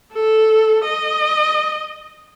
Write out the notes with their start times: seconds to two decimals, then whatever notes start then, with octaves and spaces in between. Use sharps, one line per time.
0.14 A4
0.85 D#5